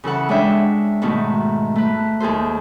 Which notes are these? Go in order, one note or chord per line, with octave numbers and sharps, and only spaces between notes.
C#3 E3 A4 F#5
G#3 D4 C#5 E5 G5
G#2 B2 D#3 A3
A3 B4
D#2 G#4 A4 C5